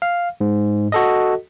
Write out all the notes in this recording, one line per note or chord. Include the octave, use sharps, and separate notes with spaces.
F5
G#2
F#4 A4 D#5